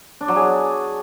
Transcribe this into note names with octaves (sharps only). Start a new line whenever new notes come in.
D4
F#3
G#4